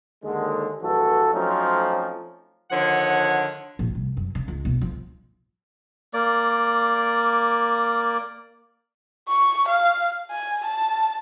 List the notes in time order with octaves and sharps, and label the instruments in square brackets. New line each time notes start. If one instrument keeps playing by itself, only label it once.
[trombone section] D#2 D3 G#3
A#1 G2 E3 F#4 A4
F3 F#3 A3 C4 C#4 D#4
[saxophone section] D3 D#3 F3 C#5 F#5
[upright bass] A#1
C2
F#2
C#3
C#2
B1
F3
[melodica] A#3 D5
[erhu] C#6
F5
G#5
A5